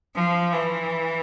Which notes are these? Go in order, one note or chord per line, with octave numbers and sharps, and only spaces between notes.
F3
E3